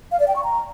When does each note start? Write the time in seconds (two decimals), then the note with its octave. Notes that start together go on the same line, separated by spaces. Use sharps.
0.12 F5
0.20 D5
0.28 G5
0.36 C#6
0.44 A#5